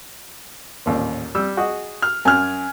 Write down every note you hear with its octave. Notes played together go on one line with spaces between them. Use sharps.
A1 D#2 A#2
G3 E6
F#4 G#4 D#5
F6
F#2 G#5 F6